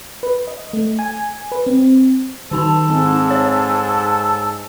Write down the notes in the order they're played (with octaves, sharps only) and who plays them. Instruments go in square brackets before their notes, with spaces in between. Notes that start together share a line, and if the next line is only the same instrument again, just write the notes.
[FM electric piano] B4
D#5
A3
G#5
B4
C4
[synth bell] D#3 D#4 A5 [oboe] A4
[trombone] G#2 [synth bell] C4
[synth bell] C#5